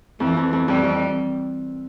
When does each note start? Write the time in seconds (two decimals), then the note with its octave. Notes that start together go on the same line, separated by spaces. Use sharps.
0.20 F2 E3
0.37 F2
0.53 F2
0.68 F2 G3
0.84 F2